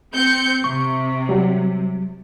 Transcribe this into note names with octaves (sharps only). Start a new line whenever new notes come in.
C4 G6 C#7
C3 C#6
F#3 G3